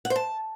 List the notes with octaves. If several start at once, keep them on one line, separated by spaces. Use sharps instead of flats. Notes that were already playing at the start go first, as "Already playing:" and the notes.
F#5
C5
A5